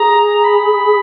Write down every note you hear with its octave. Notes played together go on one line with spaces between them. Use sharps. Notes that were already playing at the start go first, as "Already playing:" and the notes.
Already playing: G#4 A#5
B5